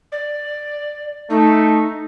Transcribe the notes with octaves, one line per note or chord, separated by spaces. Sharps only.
D5
A3 D#4